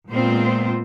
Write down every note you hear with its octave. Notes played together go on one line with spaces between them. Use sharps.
A#2 G#3 B3 C4 F4 C5